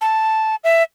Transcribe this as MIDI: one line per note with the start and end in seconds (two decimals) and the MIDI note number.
0.01 0.55 81
0.64 0.83 76